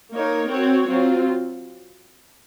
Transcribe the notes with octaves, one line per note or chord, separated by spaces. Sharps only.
A#3 D#4 A#4 C#5
C4 F#4 C#5
F#3 C4 F4